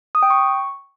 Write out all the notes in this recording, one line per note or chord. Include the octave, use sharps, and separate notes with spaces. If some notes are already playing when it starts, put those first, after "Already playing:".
D#6
G5
C#6